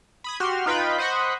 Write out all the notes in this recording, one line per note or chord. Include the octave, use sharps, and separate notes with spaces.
B5 D#6 G#6
F#4 G4 C6 F6
D#4 F4 B4 G5 B5
C5 D#5 F#5 B5 C#6